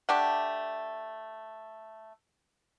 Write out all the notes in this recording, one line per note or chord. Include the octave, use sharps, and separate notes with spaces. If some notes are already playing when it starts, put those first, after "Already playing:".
A3 D4 G4 F#5